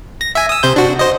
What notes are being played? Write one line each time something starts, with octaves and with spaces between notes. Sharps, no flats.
A#6
E5 G#5
D#6 E6
C3 C5 G6
D4 F#4
C5 D#5